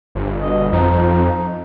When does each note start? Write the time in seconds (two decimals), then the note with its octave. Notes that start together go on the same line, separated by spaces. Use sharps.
0.15 G1
0.41 B2 D#5
0.72 F2 F3 D#4